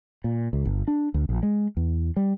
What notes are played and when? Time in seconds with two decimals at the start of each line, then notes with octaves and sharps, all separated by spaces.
0.24 A#2
0.53 C#2
0.65 G1
0.88 D4
1.14 D2
1.29 A#1
1.43 G#3
1.77 E2
2.16 G3